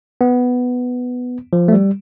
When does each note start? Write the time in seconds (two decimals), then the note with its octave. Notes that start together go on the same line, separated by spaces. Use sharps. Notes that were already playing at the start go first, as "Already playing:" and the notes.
0.21 B3
1.53 F3
1.68 A3
1.73 G3